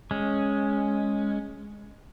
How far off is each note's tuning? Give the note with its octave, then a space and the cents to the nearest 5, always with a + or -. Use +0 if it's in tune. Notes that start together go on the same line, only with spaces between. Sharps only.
G#3 +0 C#4 +0